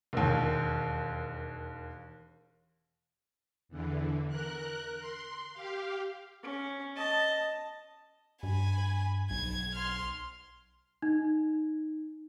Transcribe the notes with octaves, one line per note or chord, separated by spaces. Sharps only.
E1 D#2
E2 D3 E3
A#4 F#6
C6
G4 F5
C#4
D#5 A5
G2 G#5 B5
B1 G#6
C6 F6
D#4